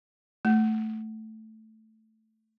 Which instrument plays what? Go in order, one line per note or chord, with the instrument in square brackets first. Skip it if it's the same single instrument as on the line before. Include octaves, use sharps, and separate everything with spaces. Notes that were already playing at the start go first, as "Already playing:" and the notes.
[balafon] A3